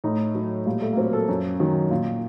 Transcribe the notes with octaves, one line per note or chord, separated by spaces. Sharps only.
A2 D#4
F#3
A#2 G3
A3
A#3
F#3 C4
A#4
A4
F#2
D#3 F#3
A#2